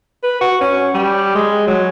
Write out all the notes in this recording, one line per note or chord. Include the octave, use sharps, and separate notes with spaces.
B4
F#4
C#4
G3
G#3
F#3